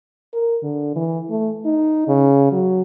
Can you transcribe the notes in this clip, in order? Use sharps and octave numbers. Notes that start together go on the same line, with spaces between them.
A#4
D3
E3
A3
D#4
C#3
F#3